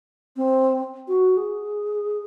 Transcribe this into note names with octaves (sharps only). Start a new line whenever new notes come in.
C4
F#4
G#4